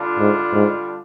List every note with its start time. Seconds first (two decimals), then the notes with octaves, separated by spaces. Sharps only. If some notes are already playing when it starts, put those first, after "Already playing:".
Already playing: D3 G3 D4 F4
0.18 G#2
0.53 G#2